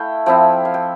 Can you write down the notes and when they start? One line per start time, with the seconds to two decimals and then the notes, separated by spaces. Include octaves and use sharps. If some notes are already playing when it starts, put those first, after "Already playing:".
Already playing: A3 E4 F5 G5
0.26 F3 C4 E4 G5
0.65 F5
0.74 G5